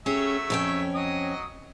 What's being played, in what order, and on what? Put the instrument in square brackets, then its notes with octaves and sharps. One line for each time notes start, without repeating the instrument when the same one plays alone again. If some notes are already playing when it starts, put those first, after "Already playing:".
[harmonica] F#3 A3 E5 [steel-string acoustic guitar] C#4 G4 G#4
[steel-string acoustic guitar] F2 C#4 G5
[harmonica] F#3 D#5 D#6